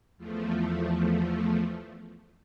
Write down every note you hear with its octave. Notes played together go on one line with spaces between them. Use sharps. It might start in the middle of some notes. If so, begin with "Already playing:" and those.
E2 F3 A3